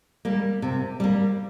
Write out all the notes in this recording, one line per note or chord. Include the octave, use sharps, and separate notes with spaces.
G3 A#3
C3
G3 A#3